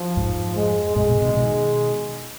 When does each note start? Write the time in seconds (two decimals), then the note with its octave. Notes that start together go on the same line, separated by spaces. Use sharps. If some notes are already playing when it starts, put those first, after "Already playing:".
Already playing: F3
0.17 F2 G#2
0.56 G#3
0.96 F#2 A#2 G#3
1.09 G#2 B2
1.22 B2 D#3
1.35 B2 D#3